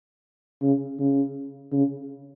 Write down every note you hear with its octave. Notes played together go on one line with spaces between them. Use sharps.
C#3
C#3
C#3